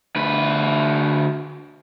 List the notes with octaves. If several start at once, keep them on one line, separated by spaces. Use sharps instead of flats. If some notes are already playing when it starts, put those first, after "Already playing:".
D2 B4